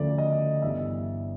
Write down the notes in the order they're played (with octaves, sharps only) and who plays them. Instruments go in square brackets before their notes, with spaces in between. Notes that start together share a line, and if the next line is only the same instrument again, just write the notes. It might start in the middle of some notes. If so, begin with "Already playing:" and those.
Already playing: [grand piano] D2 C#3 F3 A3 D5
D#5
G1 G2 E3 G3 E5